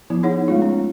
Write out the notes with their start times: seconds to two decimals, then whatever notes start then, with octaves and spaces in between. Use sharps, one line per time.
0.10 F3 B3 E4
0.23 D#4 G#4 C#5 F#5
0.48 G#3 A3 F4
0.62 C#4